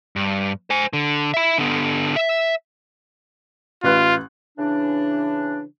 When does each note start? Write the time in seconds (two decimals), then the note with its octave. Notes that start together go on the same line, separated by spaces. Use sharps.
0.16 G2
0.70 C5 G#5
0.93 D3
1.34 E5 B5
1.58 D3 B3
2.16 E5
3.84 A1 F4 B4 F#6
4.58 C#3 E3 D4